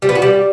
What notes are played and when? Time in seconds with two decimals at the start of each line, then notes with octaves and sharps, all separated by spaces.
0.02 G3
0.09 B3
0.15 F#4
0.22 G3